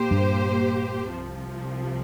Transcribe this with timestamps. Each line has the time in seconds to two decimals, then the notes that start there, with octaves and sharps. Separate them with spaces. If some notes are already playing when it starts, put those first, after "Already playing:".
Already playing: A#2 A#3 G4 C5
0.11 G2
1.11 C2 C3 F3